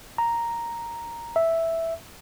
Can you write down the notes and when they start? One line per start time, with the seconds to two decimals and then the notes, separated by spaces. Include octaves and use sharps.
0.18 A#5
1.36 E5